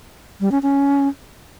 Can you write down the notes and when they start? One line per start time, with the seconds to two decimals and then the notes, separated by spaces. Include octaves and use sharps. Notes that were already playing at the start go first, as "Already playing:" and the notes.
0.41 G3
0.52 C#4
0.63 C#4